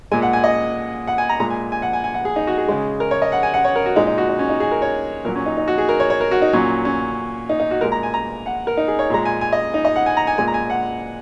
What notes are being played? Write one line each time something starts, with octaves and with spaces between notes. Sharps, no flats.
A#2 G#3 G#5
F#5
G#5
D#5
F#5
G#5
A#5
A#2 G#3 A#5
G#5
G#5
F#5
G#5
G#5
F#5
G#4
D#4
F#4
G#4
C#3 G#3
A#4
C#5
D#5
F#5
G#5
F#5
C#5
A#4
F#4
A#2 G#3 D#4
D#4
F#4
D#4
C#4
D#4
G#4
A#4
C#5
A#2 F#3 A#4
C#4
D#4
D#4
F#4
G#4
A#4
C#5
C#5
A#4
F#4
D#4
A#2 F#3 C#4
C#4
D#4
D#4
F#4
A#2 G#3 A#4
A#5
G#5
A#5
F#5
A#4
D#4
G#4
C#5
A#2 G#3 A#5
G#5
G#5
D#5
D#4
D#5
F#5
G#5
A#5
G#5
A#2 G#3 G#5
A#5
G#5
F#5